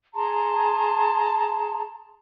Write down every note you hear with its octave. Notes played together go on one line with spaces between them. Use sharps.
G#4 A5 A#5 C6